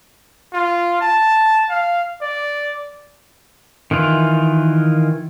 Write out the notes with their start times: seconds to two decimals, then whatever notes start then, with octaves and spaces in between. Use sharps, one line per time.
0.54 F4
1.01 A5
1.70 F5
2.22 D5
3.91 D#3 E3 F4